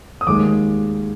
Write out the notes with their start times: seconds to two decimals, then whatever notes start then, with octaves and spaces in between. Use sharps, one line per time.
0.21 D#6
0.27 D#2 D#3 G#3 D6